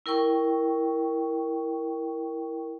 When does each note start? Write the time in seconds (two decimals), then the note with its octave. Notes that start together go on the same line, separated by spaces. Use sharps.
0.06 E4 A#4 G5 C#6